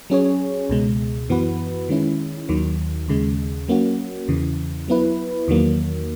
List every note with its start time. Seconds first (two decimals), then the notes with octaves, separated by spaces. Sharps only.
0.10 F#3 C#4 G#4 C#5
0.69 C#2 B2 G#3
1.29 F#2 E3 B3 F#4 B4
1.89 D#3 G#3 C#4 E4
2.49 D#2 D#3 F#3
3.08 D#2 C#3 G#3
3.68 F#3 A#3 C#4 F#4
4.28 E2 C#3 E3
4.88 F#3 B3 E4 B4
5.48 E2 D#3 F#3 A#3